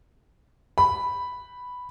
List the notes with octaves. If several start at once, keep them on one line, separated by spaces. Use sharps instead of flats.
B5